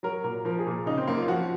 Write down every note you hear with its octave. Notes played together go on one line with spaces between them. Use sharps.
F#3 A#4
A#2 A#4
F3 A#4
G#4
A#2
C#3 D#4
C4
F#2 A#3
F4
F3 F#4